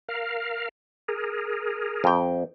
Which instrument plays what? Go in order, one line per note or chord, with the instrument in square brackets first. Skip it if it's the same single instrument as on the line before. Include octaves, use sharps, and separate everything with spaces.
[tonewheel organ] A#4 F5
G#4 A#4
[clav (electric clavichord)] F2 G5